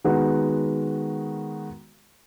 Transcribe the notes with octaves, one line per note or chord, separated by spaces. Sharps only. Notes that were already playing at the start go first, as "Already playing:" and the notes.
D#3 G#3 B3 F#4